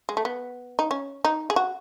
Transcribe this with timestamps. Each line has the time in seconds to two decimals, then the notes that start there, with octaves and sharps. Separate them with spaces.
0.09 G#3
0.17 A3
0.25 B3
0.79 D#4
0.91 C#4
1.25 D#4
1.50 G#4
1.56 F#4